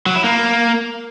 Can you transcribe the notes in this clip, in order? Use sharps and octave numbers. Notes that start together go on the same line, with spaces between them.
F#3
E4
A#3